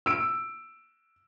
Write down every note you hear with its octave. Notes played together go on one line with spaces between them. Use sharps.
E6 D7